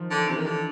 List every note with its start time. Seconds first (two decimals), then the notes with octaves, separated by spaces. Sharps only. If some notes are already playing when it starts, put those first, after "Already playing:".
Already playing: D#3 F3
0.11 D3
0.18 D#3
0.28 C3 E3
0.37 D#3
0.45 D3